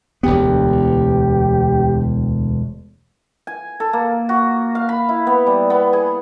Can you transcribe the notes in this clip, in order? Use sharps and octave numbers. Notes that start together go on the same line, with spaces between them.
E1 D2 B3 G4
G#5
A4
A#3
F#4
F5
B5
E4
B3
G3
B3
G#4